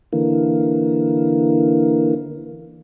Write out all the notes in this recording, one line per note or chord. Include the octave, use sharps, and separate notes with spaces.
D3 E3 A#3